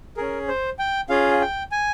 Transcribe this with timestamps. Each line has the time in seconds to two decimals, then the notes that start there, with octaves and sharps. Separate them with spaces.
0.17 C#4 G#4 A#4
0.48 C5
0.79 G5
1.09 C#4 F4 G#4 F5
1.41 G5
1.72 G#5